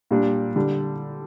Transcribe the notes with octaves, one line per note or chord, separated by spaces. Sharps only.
A#2 G3 D4
D3 G3